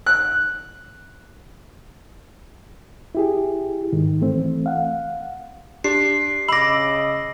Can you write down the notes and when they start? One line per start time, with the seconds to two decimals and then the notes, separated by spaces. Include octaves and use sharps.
0.06 F#6
3.15 E4 G4 G#4
3.93 G#2 D#3
4.21 E3 A3 C4
4.66 F5 F#5
5.84 D4 G4 C7
6.48 C#3 D#5 B5 D6 E6 A#6 F#7